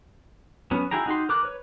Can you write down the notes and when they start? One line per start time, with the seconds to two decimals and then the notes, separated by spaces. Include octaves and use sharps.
0.71 F#3 B3 C#4
0.91 E4 F#4 G#4 G5 A#5
1.06 D#4 F#4 G4 C6
1.29 A#4 D6 F#6
1.43 B4 C#5